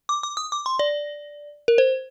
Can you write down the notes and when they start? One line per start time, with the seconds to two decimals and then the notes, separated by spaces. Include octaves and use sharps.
0.09 D6
0.23 D6
0.37 D#6
0.52 D6
0.66 C6
0.79 D5
1.68 A#4
1.78 C5